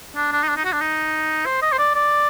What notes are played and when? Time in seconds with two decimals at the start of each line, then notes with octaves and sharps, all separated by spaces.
0.16 D4
0.32 D4
0.44 D#4
0.49 D4
0.57 D#4
0.65 F#4
0.73 D4
0.81 D#4
1.46 C5
1.62 D#5
1.72 C5
1.79 D5
1.95 D5